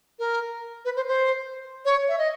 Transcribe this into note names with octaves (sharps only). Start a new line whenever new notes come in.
A#4
B4
C5
C5
C#5
E5
D#5